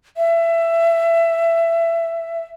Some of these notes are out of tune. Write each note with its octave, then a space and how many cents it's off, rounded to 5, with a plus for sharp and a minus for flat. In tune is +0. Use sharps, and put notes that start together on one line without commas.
E5 +20